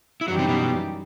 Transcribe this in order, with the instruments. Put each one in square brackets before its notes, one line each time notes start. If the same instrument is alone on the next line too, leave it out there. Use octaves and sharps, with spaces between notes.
[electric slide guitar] E4
[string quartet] F#2 E3 G3 D#4 G4 [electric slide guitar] F#3 F#4
[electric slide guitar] C3 C4
B2 B3